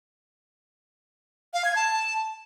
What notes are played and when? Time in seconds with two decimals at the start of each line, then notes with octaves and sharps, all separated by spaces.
1.53 F5
1.64 G#6
1.75 A5